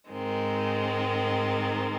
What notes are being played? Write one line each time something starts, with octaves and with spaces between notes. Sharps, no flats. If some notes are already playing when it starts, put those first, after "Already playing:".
G#2 D#3 G#3 C4